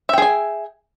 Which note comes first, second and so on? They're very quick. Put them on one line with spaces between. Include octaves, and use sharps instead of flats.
E5 G5 G#4 G#5